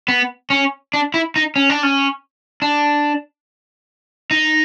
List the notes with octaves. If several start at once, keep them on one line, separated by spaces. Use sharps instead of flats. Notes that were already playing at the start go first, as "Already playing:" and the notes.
B3
C#4
D4
E4
D#4
C#4
D4
C#4
D4
D#4